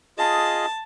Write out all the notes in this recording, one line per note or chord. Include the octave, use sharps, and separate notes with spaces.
F4 G#4 D#5 A5